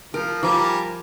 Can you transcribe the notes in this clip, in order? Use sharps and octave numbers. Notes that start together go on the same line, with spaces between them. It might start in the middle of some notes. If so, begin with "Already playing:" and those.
F3 A#4
F3 G3 A#4 G#5 D6